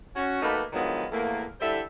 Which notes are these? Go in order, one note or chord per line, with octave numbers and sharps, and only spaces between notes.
C#4 F#4
B2 A3 A#3 D#4 B4
D3 D#3 F3 F#3 G#3 B3
E2 A2 A3 A#3
D3 G3 E4 A4 C5 E5